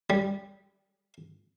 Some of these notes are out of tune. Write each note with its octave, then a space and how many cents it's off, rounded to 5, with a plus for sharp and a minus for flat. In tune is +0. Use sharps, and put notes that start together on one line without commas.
G3 +5